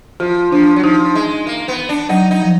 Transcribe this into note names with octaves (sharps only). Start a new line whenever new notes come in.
F3 F4
F3 D4
F#3
F3 D#4
G#3
A#3
B3
D4
F#3 D#4
D#4
F3